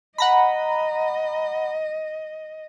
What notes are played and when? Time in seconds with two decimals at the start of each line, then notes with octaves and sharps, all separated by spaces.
0.18 D#5 F#5 A#5 B5